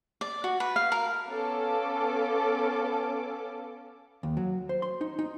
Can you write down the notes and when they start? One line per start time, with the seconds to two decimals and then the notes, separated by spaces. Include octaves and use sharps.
0.21 D5
0.44 F#4
0.60 B4
0.76 F5
0.92 A#4
1.29 B3 C#4 A4 F5 D6
4.23 D#2
4.37 F#3
4.69 C5
4.82 C6
5.01 D#4
5.19 D#4